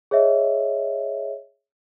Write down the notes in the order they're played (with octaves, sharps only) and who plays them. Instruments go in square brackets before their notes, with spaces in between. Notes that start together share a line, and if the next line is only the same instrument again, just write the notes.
[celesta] G#4 C#5 D#5 E5